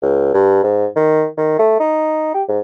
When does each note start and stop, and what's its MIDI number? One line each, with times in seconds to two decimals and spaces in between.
0.02 0.31 37
0.34 0.62 43
0.64 0.87 44
0.96 1.26 51
1.38 1.55 51
1.59 1.77 57
1.80 2.32 63
2.34 2.43 67
2.48 2.60 44